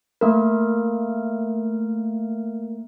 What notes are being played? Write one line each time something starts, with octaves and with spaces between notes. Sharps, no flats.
A3 A#3 A#4